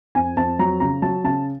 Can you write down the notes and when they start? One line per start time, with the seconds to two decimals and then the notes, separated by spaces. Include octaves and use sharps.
0.15 F2 G#5
0.37 F2 A5
0.59 F#3 A#5
0.80 C#3 A#5
1.02 F#3 A5
1.24 C#3 A5